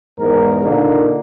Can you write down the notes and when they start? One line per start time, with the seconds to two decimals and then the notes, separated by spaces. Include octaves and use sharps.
0.18 E2 G#2 A#4
0.63 A#2 D3 A#3 D#4